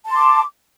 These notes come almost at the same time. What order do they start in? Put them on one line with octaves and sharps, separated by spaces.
A5 C6 D6